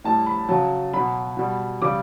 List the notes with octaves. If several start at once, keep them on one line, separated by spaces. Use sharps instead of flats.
A2 G3 A5
B5
C#3 F#3 A5
B2 F#3 B5
B2 G3
C#3 G3 D6